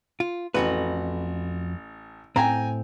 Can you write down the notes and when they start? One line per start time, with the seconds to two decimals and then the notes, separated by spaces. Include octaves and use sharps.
0.20 F4
0.54 A1 F2 F#4 B4
2.36 A2 C4 G5 G#5 A#5